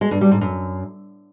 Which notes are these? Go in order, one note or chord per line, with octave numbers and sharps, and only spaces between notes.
G#3
G2
G3
G#2
F#2